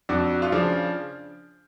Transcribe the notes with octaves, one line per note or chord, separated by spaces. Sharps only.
F2 D4 F#4
F4
C#3 F3 D4